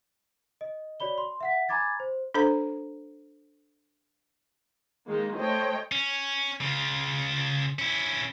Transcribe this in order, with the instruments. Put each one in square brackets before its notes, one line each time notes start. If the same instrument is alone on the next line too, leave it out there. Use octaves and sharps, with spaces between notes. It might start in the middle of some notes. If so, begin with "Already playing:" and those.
[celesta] D#5
F#4 C#5 D5 B5 G7
C6
E5 F#5 B6
G#5 A#5 B5 D6 G#6 A6
C5
[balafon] D4 A4 C5 A#5
[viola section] D#3 G#3 A#3 D#4
A3 C5 C#5 D#5 G5
[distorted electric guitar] C#4
C#3 F4
C#4 E4